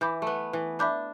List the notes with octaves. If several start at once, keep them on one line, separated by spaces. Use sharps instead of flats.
E3 E5 B5 D6 G6
A3 B3
E3
D4 E5 B5 D6 G6